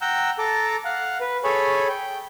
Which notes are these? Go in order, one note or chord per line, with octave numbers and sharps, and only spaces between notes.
F#5 G5 A#5 E6 G6
A4 A5 A#5 D6
F5 F#5
B4
G#4 A4 C#5 G#5 B5 C#6
G5